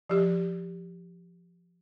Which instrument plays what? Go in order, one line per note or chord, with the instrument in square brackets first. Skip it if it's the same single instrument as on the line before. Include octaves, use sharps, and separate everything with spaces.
[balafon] F3 G4